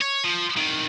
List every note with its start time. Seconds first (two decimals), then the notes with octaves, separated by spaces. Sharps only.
0.02 C#5
0.25 F3
0.57 C2 D#3